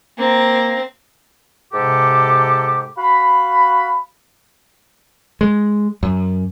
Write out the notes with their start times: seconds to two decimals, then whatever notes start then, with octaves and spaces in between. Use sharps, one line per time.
0.18 A#3 C4 A#5
1.72 G#2 C3 G4 A4 D6
2.97 F#4 F5 B5
5.41 G#3
6.03 F#2